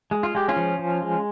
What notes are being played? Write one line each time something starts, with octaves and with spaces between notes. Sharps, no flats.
G#3
F4
G#3 G4
C#4 F4
F3
F3
G#3